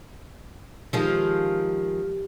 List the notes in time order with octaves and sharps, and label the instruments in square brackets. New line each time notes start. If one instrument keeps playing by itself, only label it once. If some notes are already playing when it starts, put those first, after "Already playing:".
[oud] D#3 F3 G#3 [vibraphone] G4